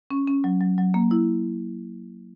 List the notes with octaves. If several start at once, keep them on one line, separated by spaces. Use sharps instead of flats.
C#4
C#4
F#3
F#3
F#3
A#3
E4